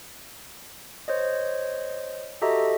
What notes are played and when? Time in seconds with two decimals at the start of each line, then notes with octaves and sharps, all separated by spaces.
1.08 C5 C#5 D#5
2.42 F#4 G4 A4 D#5 E5 A#5